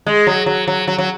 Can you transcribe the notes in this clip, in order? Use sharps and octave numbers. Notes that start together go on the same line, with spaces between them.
G#3
F#3
F#3
F#3
F#3
F#3